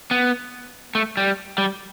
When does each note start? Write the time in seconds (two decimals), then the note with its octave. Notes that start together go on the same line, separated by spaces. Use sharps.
0.11 B3
0.95 A3
1.17 G3
1.58 G3